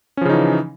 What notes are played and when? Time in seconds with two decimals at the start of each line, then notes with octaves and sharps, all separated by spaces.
0.17 C#4
0.21 F3
0.25 C#3
0.29 D#4
0.33 E3